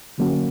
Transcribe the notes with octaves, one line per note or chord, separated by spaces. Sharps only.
D3 F#3 A#3 C#4 F#4